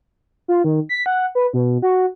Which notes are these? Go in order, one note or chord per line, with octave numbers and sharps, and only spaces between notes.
F4
D#3
B6
F#5
B4
B2
F#4